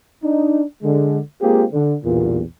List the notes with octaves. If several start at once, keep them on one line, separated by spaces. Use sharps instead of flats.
D4 D#4
D3 G#3
G#3 A#3 C4 F4 G4 G#4
D3
B1 E2 G2 A#2